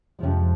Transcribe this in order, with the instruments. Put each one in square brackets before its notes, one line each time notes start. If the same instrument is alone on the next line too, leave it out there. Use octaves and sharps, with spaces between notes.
[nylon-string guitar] F2 C3 F3 G#3